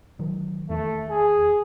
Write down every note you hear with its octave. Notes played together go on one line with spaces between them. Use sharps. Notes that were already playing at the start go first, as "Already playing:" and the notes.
D#3 F#3
E2 D#3 A3
G#4